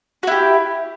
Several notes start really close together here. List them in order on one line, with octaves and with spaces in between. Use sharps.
F#4 E4 G4